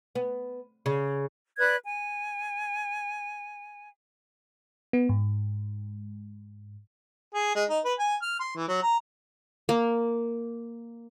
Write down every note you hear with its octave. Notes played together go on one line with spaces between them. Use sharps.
B3
C#3
B4 D5 F#6 G#6
G#5
B3
G#2
G#4
G#3
D#4
B4
G#5
F6
C6
E3
F#3
A#5
A#3